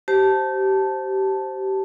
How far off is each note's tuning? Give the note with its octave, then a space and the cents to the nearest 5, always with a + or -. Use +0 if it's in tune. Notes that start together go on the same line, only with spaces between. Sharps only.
G4 -25 C5 +0 A5 +0